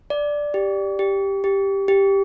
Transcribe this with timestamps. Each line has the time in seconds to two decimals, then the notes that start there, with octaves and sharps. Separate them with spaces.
0.10 D5
0.54 G4
0.99 G4
1.44 G4
1.88 G4